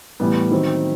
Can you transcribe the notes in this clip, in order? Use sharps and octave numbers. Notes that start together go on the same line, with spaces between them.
A2 E3 G3 B3
D#3 F#3 C4